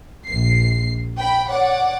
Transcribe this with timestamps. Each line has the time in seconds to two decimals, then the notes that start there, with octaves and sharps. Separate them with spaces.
0.25 A#1 C7
1.17 G5 B5
1.50 C#5 D5 F#5 D6